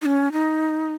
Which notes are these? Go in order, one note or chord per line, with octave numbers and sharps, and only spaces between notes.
D#4
C#4
D#4